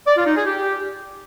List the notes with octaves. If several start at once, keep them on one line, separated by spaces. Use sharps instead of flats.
D5
F4
D#4
G#4
G4